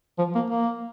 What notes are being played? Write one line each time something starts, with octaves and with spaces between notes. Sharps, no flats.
F3
A#3
A#3